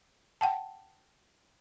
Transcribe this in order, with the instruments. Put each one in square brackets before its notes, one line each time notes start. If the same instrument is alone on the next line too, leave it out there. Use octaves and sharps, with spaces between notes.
[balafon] F#5 G5 A5